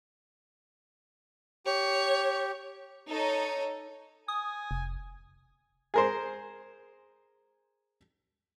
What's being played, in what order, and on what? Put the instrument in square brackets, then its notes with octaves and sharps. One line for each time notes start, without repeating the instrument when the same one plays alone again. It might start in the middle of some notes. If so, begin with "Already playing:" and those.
[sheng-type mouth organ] G4 [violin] C#5
[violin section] D#4 A4 C#5
[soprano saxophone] G#5 [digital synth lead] D#6
[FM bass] F1
[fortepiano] G#4 A#4 C5